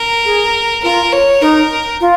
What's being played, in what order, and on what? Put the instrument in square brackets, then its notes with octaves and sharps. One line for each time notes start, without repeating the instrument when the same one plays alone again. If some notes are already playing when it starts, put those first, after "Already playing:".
Already playing: [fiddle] A#4
[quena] G#4
[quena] F4 [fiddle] A#4
[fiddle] C#5
[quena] D#4 [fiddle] A#4
[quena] F4